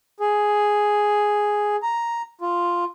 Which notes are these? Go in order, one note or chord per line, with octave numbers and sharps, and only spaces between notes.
G#4
A#5
F4